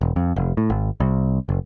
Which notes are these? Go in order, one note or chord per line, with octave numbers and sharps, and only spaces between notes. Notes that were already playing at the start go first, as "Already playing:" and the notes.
E1
F2
F1
A2
G#1
C2
F#1